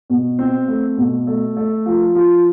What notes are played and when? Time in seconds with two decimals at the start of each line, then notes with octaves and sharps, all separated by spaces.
0.10 B2
0.39 C4
0.68 A3
0.98 B2
1.27 A3
1.57 A3
1.86 F3
2.15 F3